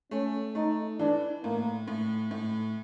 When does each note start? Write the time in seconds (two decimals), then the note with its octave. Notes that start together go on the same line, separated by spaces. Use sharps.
0.11 A3 C#4
0.55 A3 D#4
0.99 E3 D4
1.44 A2 A#3
1.87 A2
2.31 A2